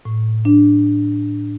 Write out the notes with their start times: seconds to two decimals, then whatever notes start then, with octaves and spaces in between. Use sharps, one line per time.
0.05 A2
0.45 D4